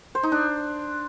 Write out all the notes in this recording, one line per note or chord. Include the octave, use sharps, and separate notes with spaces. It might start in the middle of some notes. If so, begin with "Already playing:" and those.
C5
D#4
D4